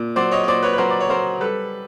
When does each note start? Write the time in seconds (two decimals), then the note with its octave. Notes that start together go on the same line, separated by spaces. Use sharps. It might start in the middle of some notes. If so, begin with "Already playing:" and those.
Already playing: A#2
0.16 F#3 C5 D5
0.31 C#5 D#5
0.44 D#5
0.48 A#2 C5 D5
0.63 B4 C#5
0.73 B4
0.78 F#3 A#4 C5
0.90 D5
1.00 C#5
1.09 F#3 A#4 C5
1.40 G3 A4 B4